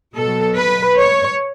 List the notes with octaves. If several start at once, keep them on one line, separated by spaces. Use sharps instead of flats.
B2 F#3 A4
B4
C#5